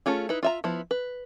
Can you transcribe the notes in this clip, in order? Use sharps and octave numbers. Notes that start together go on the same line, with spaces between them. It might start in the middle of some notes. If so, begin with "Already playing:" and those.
A3 C#4 F4 G#4
D#4 E4 B4
F4 E5 A#5
F3 B3 E4
B4